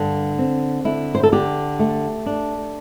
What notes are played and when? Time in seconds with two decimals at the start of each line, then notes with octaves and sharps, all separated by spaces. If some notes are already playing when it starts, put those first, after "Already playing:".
Already playing: G2 D3
0.38 C4
0.85 D3 E4
1.15 C5
1.23 A4
1.32 D3 G4
1.79 A3
2.26 D4